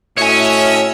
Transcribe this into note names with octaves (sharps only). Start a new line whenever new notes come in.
A2 F#4 C#5 D#5 E5 G#5